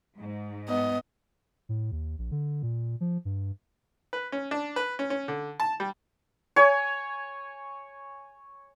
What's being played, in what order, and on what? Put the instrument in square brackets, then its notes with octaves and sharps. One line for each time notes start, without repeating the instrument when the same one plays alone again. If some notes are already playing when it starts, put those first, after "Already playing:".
[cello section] G#2
[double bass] B3 [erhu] D#5
[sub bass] A2
D#2
A#1
D3
A#2
F3
G2
[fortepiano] B4
C#4
D4
B4
C#4
C#4
D3
A5
G3
[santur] C#5 G#5